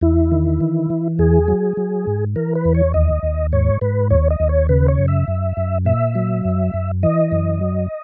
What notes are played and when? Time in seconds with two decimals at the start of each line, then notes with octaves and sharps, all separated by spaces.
0.01 E2 E4
0.32 D#3
0.61 E3
0.90 E3
1.19 E2 G#4
1.48 F#3
1.77 F#3
2.07 G#2
2.36 E3 A#4
2.55 B4
2.65 E2
2.75 C#5
2.94 D#2 D#5
3.23 D#2
3.52 G#2 C#5
3.81 G#2 B4
4.10 D#2 C#5
4.30 D#5
4.40 D#2
4.49 C#5
4.69 C#3 B4
4.88 C#5
4.99 F#2
5.08 E5
5.28 F#2
5.57 F#2
5.85 A#2 E5
6.15 F#3
6.45 F#2
6.74 F#2
7.03 E3 D#5
7.32 F#2
7.61 F#3